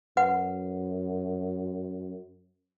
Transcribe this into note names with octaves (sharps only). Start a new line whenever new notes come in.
F#2 B4 F#5